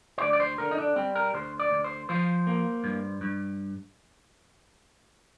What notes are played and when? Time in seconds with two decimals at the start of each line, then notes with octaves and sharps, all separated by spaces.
0.18 C5
0.22 D2 D5
0.33 D5
0.40 C5
0.58 D3 A#4
0.71 D#4
0.78 D4
0.96 G3 C4
1.15 A#4
1.34 D2 C5
1.59 D5
1.71 D2
1.84 C5
2.09 F3 C5
2.47 A#3
2.84 G2
3.21 G2